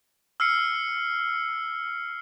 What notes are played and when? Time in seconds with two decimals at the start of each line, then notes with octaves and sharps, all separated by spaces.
0.40 E6 F6 C7 C#7